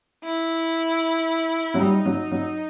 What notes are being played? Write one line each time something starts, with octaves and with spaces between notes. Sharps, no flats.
E4
F#3
G3 D#4
F#3
F#3